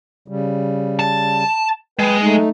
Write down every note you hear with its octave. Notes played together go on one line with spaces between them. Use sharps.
C#3 G3
A5
G#3 B4 G5
A3 D#4